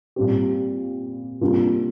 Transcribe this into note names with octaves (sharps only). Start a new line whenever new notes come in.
A#2 G3 C4 G4
C3 G3 A#3 D4 F4